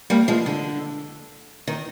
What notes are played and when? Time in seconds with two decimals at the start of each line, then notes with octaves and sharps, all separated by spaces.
0.10 G3 A#3
0.28 F3 G#3
0.46 D3
1.67 D#3